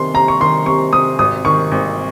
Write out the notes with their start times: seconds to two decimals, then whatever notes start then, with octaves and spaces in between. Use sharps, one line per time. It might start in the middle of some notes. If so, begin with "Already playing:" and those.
Already playing: C3 D#3 C6
0.14 C3 A#5
0.28 C#6
0.40 D#3 C6
0.66 C3 C#6
0.93 C3 D#6
1.19 G#1 D#6
1.45 D#3 C#6
1.71 G#1